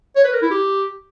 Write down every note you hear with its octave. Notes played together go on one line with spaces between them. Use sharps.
C#5
B4
A#4
E4
G4